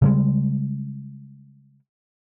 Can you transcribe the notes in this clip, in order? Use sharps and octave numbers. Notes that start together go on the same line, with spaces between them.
C#3 G3 G#3